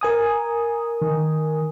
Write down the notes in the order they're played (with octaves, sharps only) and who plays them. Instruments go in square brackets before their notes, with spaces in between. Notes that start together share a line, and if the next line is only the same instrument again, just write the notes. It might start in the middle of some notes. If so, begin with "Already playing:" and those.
[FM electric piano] A#4 G#5 D#6
[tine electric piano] D#3